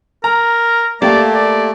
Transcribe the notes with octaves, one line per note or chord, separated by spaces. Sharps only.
A#4 A#5
A3 A#3 G4 D5
D5